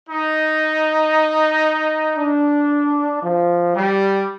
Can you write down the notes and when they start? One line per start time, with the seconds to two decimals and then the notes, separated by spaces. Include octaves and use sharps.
0.09 D#4
2.18 D4
3.22 F3
3.75 G3